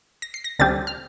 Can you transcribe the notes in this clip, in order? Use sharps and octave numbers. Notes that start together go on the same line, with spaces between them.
A#6
C7
A#6
D2 D3 G3 C4 A6
F6